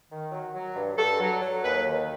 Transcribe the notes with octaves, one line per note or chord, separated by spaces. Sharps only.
D#3
F#3
F#3
G2
G2 A4
F#3
F#3
D#2 B4
D#3